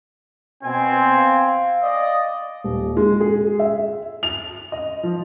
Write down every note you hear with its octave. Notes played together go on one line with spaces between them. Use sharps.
B2 C4 G#5
F5
D5 D#5
D#1
G#3
G#4
E5
F7
D#5
F3